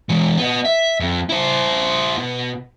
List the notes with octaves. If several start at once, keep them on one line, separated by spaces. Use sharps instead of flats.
E3 G#3
B3 D#5
E5
F2
E4 C5
B2